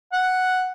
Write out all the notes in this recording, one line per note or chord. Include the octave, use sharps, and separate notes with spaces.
F#5